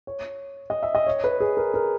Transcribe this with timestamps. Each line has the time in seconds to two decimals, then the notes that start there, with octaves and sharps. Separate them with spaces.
0.07 C#5
0.70 D#5
0.83 E5
0.95 D#5
1.07 C#5
1.24 B4
1.40 G#4
1.57 A#4
1.74 A#4